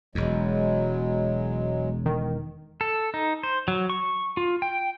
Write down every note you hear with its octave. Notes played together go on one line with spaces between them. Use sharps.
E1 E2 F#3 G#3
D#3
A4
D#4
C5
F#3
C#6
F4
G5